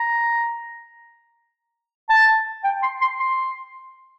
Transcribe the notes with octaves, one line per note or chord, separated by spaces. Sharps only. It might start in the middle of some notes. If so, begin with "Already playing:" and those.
Already playing: A#5
A5
G5
C6
C6
C6